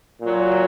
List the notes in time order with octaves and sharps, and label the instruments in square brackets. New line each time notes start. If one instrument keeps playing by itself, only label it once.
[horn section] A#2 F#3